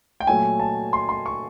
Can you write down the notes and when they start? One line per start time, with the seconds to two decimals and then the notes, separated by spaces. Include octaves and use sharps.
0.20 G5
0.27 A#2 F#3 A3 G#5
0.60 A5
0.93 C6
1.09 C6
1.26 C#6